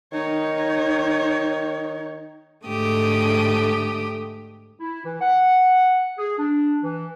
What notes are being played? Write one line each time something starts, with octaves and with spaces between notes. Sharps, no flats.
D#3 D#4 C#5
G#2 D3 A3 G4 D#6
E4
E3
F#5
G#4
D4
E3